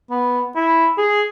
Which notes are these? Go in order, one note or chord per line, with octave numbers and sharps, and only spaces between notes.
B3
E4
G#4